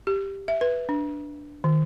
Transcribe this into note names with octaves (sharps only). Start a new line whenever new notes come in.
G4
E5
B4
D4
D#3